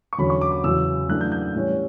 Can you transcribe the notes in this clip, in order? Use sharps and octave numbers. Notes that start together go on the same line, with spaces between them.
C#6
E2 D3 F#3 C#4 B5
C#6
D6
D6
E2 C#3 F#3 E6
F#2 E3 A3 D4 F#6
G6
G6
A2 E3 G3 C#4